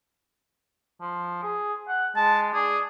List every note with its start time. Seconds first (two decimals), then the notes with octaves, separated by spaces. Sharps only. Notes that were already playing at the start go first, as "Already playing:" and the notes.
1.01 F3
1.43 G#4
1.88 F#5
2.16 G#3 A5
2.54 D4 G#4